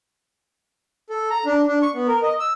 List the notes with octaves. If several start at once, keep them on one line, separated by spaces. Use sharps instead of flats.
A4
A#5
D4
D4
C#6
B3
A#4
D#5
E6